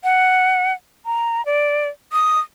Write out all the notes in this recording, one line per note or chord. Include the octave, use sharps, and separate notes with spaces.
F#5
A#5
D5
D#6